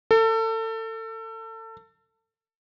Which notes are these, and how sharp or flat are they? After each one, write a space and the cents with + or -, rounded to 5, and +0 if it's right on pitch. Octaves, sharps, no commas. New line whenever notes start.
A4 +30